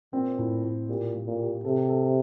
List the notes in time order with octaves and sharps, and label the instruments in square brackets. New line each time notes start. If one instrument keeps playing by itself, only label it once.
[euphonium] A#2 [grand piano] C4
[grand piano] A2
A2
[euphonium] A#2 [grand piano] G4
[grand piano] A#3
[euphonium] A#2
[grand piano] G4
[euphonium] C3 [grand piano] A4
[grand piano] A4